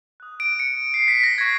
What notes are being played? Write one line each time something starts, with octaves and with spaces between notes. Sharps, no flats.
D#6 F#6
D7
C#7
C7
B6
A#6
C#6 F#6 G#6